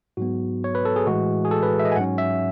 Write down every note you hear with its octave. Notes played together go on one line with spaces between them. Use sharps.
G#2 F#3 B3 F#4
C#5
B4
A4
G#4
A2 E3 G#3 F#4
G#4
A4
B4
E5
D#5
G#5
G#2 F#3 C#4 F#5
E5